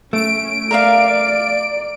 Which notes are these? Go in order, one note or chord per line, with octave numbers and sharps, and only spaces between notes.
A3 C#4 D7
A#4 D5 E5 F5